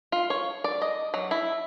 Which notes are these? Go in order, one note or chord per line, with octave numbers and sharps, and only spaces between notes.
F4
C#5
D5
D#5
F#3
E4